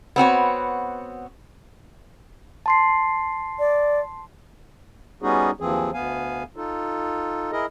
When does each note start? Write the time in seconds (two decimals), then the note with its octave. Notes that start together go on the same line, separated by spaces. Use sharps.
0.16 B3 C4 F#4 C#5
2.66 A5 C6 C7
3.59 D5
5.22 G3 B3 C#4 D#4 F#4 G#4
5.60 D#2 E3 F3 C4 G#4
5.93 D2 B3 F5 G#5
6.56 D#4 F4 A4
7.52 E4 G#4 A#4 D#5